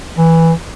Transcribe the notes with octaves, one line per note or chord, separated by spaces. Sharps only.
E3